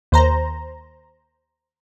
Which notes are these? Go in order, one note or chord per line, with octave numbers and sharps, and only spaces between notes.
D#2 C5 A#5